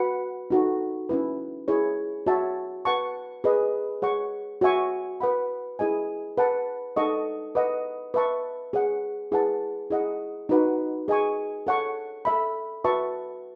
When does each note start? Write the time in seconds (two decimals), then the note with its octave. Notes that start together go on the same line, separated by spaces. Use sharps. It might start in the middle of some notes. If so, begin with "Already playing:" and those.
Already playing: F#4 B4 F#5 B5
0.50 D#4 F#4 A4
1.09 C#4 E4 B4
1.68 E4 G#4 C#5
2.26 F#4 C#5 E5 A5
2.85 B4 F#5 A5 C#6
3.44 G#4 B4 D#5
4.02 G#4 C#5 F#5 C#6
4.61 F#4 C#5 E5 G#5 C#6
5.20 B4 F#5 B5
5.79 E4 G#4 D#5 G#5
6.38 B4 F#5 A5
6.96 D#4 A4 D#5 F#5 C#6
7.55 B4 D#5 F#5
8.14 B4 E5 A5 C#6
8.73 G#4 C#5 F#5
9.32 E4 G#4 B4 F#5 A5
9.90 E4 G#4 D#5 F#5
10.49 D#4 F#4 B4 F#5
11.08 G#4 D#5 G#5 C#6
11.67 A4 C#5 F#5 A5 C#6
12.25 A4 E5 B5
12.84 F#4 B4 E5 A5 C#6